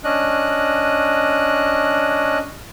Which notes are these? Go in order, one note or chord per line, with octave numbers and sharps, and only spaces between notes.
C#4 D4 D#5 F#6